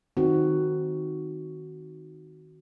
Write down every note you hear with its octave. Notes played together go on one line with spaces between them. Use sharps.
D#3 C4 D#4 F#4